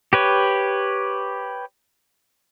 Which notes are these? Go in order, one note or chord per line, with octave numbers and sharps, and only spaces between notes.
G4 B4 C#5